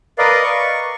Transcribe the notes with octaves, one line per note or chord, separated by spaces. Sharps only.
A#4 B4 D5 D#5 F5
C#6